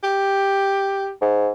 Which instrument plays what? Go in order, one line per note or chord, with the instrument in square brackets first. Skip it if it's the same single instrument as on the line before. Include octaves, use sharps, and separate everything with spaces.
[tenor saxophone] G4
[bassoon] G#2